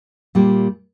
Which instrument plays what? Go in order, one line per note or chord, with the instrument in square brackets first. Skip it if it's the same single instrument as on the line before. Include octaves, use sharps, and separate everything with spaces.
[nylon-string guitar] A#2 G3 A#3